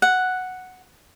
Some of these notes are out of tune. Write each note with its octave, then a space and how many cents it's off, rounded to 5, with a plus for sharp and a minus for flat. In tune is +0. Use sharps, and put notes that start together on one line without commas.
F#5 +0